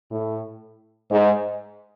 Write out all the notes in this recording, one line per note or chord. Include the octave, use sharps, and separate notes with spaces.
A2
G#2